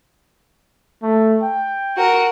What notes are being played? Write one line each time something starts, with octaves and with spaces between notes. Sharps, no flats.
A3
G5
F#4 A#4